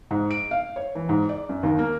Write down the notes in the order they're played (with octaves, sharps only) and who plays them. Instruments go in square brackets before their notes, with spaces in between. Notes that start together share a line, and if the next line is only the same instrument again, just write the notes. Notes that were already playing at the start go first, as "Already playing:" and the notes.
[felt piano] G#2
D7
F5
C#5
E3
G#2
D5
F#2
D#2
A#3